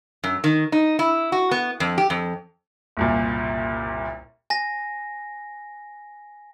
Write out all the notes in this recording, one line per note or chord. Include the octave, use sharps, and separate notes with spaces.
F#2
D#3
D#4
E4
F#4
B3
F2
G4
F2
F#1 C2 A#2
G#5 A#6